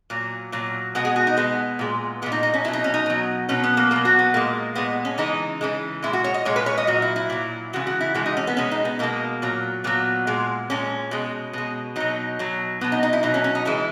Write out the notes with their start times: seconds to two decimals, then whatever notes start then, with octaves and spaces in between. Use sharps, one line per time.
0.10 A#2 F#3
0.52 A#2 F#3
0.95 B2 G#3 F#5
1.05 G#4
1.16 F#4
1.27 D#4
1.37 B2 G#3 B3
1.79 A#2 G#3
2.22 A#2 G#3 B3
2.32 D#4
2.43 D#4
2.54 C#4
2.64 F#3 E4
2.68 B2
2.73 D#4
2.84 C#4
2.94 D#4
3.06 B2 F#3
3.49 B2 F#3 C#4
3.64 B3
3.77 A#3
3.91 B2 F#3 A#3
4.05 F#4
4.19 B3
4.34 A#2 G#3 A#3
4.75 A#2 G#3 B3
5.05 C#4
5.18 C#3 E3 G#3 D#4
5.61 C#3 E3 G#3
6.03 A#2 G#3 E4
6.13 F#4
6.24 C#5
6.34 D#5
6.45 A#2 G#3 C#5
6.56 B4
6.66 C#5
6.78 D#5
6.87 A#2 F#3 F#4
7.02 E4
7.16 E4
7.30 A#2 F#3
7.73 C#3 E3 G#3 F#4
7.87 F#4
8.01 E4
8.15 C#3 E3 G#3 F#4
8.26 D#4
8.37 C#4
8.47 B3
8.57 B2 G#3 C#4
8.71 D#4
8.85 B3
8.99 B2 G#3 A#3
9.42 A#2 F#3
9.84 A#2 F#3 B3
10.27 A#2 G#3
10.70 A#2 G#3 C#4
11.11 B2 G#3
11.53 B2 G#3
11.96 B2 F#3 D#4
12.39 B2 F#3
12.81 B2 F#3 B3
12.92 D#4
13.03 D#4
13.13 E4
13.23 B2 F#3 D#4
13.34 C#4
13.44 C#4
13.55 D#4
13.65 C#3 E3 G#3 E4